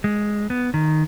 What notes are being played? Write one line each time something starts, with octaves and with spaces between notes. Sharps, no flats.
G#3
B3
D#3